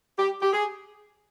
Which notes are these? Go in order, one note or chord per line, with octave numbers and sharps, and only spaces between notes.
G4
G4
G#4